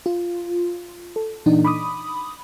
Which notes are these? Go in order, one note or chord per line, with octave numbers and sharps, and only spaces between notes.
F4
A4
A#2 E3 D4 D#4
B5 D6 D#6